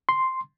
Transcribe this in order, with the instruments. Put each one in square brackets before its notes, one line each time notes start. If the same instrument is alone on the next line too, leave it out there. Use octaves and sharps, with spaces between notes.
[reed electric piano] C6